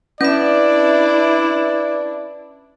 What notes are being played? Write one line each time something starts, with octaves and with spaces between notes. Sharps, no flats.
C#4 D4 E4 B4 D5 E5